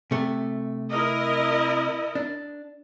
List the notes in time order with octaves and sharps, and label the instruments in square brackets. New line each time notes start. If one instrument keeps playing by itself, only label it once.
[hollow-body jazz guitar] C3 A3
[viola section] E4 A#4 D#5
[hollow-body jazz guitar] D4